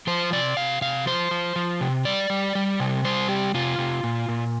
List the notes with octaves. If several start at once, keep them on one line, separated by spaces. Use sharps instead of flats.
F3 C5
C3 D5
C3 F5
C3 F5
F3 C5
F3
F3
C3
G3 D5
G3
G3
C3
G3 C5
C3 G4
C3 F4
C3
A#2
A#2